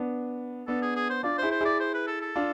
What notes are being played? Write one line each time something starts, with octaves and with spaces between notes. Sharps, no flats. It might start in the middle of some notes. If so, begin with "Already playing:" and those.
Already playing: B3 D4
B3 D4 A4
G#4
G#4
C5
D4 F4 D5
C5
E4 G#4
C5
E4 G#4 D5
C5
B4
A4
A4
D4 F4